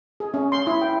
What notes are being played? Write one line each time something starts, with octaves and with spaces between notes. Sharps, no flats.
G#4
C#4
C6
E4
G5